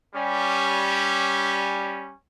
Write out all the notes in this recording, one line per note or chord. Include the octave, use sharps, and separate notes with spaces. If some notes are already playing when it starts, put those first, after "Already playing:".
G3 C#4